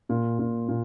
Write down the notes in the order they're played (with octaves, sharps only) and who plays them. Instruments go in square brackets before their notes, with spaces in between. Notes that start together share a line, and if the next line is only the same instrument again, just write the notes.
[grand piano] A#2
A#2
A#2